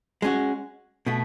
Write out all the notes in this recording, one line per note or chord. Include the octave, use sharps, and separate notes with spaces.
G#3 C#4 F#4
B2 A3